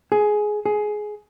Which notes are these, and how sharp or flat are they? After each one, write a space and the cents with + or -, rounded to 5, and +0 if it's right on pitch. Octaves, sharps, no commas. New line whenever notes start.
G#4 +15
G#4 +15